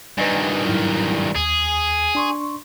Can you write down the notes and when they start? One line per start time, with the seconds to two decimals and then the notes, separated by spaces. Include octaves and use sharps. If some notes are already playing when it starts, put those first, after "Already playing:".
0.18 G2 D#3 B4 D#5 G#5
0.65 G#2 F#3 E4
1.35 D#2 G#4
2.15 D4 C6 C#6